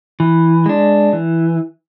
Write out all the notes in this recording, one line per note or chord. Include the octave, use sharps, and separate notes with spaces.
E3
G#3 D4
E3